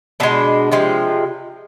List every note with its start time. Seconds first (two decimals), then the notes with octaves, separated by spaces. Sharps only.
0.20 B2 G#3 D4
0.72 C3 F3 G#3